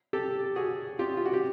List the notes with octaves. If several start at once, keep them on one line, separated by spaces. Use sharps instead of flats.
G4 A4
F#4 G#4
F4 G4
F4
F#4
G4